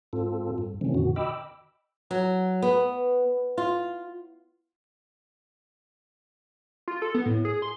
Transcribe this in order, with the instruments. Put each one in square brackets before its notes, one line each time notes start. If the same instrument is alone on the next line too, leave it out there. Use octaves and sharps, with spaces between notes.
[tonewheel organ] G#2 C4 F4 A4
G2
C3 D#3 E3 A3 C4 C#4
F2 A#2 D3 D#3 F#4
D#5 G5 B5 D6 E6
[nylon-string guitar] F#3
B3
F4
[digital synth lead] F4
A4
B3
A2
G#4
C6